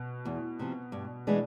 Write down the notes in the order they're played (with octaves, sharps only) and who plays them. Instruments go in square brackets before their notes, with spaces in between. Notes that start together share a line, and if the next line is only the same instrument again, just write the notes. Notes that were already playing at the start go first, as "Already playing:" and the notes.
Already playing: [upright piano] B2
[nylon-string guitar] E2
C3 F3
G2
E3 G#3 B3 D4